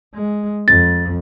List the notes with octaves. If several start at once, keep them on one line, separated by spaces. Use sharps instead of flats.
G#3
F2 A6